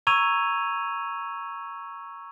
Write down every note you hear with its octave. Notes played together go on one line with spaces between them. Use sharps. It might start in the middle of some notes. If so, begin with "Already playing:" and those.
A#5 C#6 E6 G#6 D#7 F7